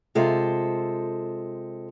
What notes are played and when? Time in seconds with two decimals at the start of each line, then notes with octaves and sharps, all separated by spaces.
0.15 C3 G#3 F4 A4 C5